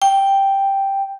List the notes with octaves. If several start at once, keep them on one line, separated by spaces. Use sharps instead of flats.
G5